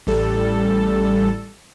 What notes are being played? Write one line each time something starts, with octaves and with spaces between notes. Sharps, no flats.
A1 G3 A4